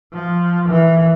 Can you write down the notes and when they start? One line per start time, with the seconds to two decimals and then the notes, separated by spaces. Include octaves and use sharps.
0.12 F3
0.69 E3